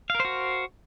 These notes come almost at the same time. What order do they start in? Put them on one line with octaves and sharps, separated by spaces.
F5 A#4 C5 F#4